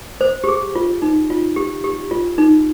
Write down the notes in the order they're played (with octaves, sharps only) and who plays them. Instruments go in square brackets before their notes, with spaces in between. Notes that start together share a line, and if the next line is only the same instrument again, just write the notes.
[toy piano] C5
G4
G#4
F4
D#4
F4
G4
G4
F4
D#4